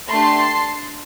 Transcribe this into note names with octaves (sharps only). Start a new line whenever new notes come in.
A3 D4 G4 A5 C6